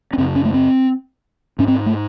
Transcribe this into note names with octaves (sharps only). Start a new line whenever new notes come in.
C#4
F#2 C#3 C4
C#4
A3
C4
G#2 C#4
C4
A3